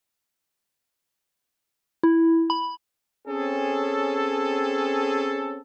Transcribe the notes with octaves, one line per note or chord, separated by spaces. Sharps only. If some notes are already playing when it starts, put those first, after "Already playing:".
E4
B5
C4 C#4 G#4 A4